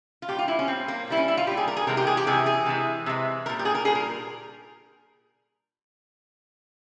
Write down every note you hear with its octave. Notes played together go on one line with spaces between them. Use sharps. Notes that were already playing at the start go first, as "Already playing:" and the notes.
F4
A#2 G3 G4
F4
E4
C#4
A#2 G3 C4
A#3
A#2 G3 E4
C#4
E4
F4
A#2 G3 G4
G#4
A#4
G#4
C3 E3 G#3 A#4
G4
G#4
G4
C3 E3 G#3 G#4
G#4
C3 E3 G#3
C3 E3 G#3
A#2 G3 A#4
G4
G#4
A#4
A#2 G3 G#4
A#4